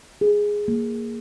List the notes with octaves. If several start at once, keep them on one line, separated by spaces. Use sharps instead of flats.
G#4
A#3